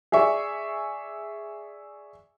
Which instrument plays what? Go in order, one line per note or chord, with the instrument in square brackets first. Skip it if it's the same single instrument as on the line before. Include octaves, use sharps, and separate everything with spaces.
[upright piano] G#4 D5 E5 C#6